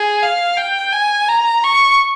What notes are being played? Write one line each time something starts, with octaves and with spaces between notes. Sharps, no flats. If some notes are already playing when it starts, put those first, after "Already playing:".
Already playing: G#4
F5
G5
G#5
A#5
C#6